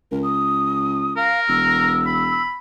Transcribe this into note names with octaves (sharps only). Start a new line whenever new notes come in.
C#2 A#4
D#6
A#4 F5
E1 E6
B5